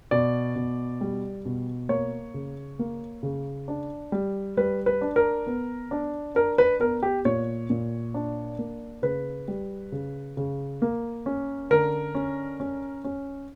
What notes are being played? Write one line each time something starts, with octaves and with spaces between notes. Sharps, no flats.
B2 D5
B2
G3
B2
A#3 C#5
C#3
A#3
C#3
D4
G3
G3 B4
B4
D4
A#4
B3
D4
D4 A#4
B4
B3 A#4
G4
A#2 C#5
A#2
D4
A#3
C#3 B4
G3
C#3
C#3
A#3
C#4
D3 A#4
C#4
C#4
C#4